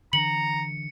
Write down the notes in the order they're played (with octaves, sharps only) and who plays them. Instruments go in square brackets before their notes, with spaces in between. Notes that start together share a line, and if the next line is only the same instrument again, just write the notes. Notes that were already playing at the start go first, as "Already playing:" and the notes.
[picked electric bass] D3 E3 D4 [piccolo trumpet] A#5 [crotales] C#7 [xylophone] F#7